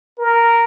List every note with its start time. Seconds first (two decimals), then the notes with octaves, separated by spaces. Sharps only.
0.19 A#4